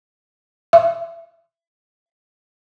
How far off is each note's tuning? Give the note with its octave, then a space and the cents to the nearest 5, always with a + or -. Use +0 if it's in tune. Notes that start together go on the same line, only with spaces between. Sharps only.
E5 +25